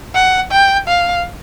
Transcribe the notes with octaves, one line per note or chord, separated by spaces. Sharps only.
F#5
G5
F5